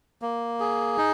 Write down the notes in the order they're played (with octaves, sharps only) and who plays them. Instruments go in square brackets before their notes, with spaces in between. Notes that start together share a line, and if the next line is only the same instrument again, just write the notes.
[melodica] A#3
G#4
D#4